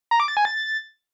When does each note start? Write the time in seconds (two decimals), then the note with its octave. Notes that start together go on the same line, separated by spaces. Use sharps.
0.11 A#5
0.20 D6
0.28 A6
0.37 G#5
0.45 A6